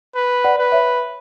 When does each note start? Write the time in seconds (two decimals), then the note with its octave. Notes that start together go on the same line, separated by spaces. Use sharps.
0.15 B4
0.44 D5 F#5
0.58 B4
0.72 C#5 E5